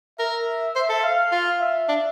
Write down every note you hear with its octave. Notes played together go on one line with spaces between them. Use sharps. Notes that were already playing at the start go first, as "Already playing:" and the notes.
A#4 E5
C5
A4
F5
F4
E5
D4